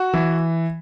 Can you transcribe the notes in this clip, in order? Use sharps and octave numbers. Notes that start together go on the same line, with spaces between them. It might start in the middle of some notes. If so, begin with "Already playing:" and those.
Already playing: F#4
E3